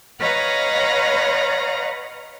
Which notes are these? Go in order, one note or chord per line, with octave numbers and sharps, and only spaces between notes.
B4 C#5 D#5 F5 F#5 A#5